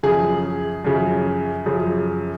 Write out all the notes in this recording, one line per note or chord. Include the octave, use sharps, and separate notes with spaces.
F#2 C#3 F3 G#4
F#2 C#3 F3
F#2 C#3 F3